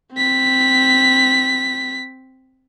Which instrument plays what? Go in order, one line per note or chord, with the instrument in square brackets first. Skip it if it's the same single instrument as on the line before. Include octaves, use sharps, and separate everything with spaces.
[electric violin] C4 B6